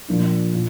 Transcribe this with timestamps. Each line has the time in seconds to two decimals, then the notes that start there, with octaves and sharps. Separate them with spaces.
0.08 A#2 F3 A#3 D4
0.54 A#2